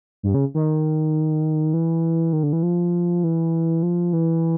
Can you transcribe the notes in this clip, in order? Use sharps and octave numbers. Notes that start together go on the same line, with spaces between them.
G2
C#3
D#3
E3
D#3
D3
E3
F3
E3
F3
E3